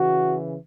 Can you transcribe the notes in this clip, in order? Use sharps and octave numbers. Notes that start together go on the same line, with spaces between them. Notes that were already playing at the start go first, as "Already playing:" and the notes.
Already playing: C#3 E3 F#4